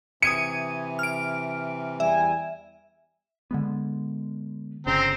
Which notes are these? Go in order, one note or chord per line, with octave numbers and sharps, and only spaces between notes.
C3 E3 D#6 G#6 C#7 D#7
F6 D7
E2 G3 E5 G#5
D3 G#3 B3
G1 C#3 C4 C5 A#5